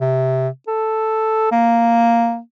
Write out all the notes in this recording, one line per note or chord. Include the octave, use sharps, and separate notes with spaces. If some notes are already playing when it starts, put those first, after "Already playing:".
C3
A4
A#3